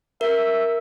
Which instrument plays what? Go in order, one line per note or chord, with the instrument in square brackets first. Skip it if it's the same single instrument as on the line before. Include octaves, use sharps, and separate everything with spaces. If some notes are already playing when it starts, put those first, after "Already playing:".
[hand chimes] A#4 [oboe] E5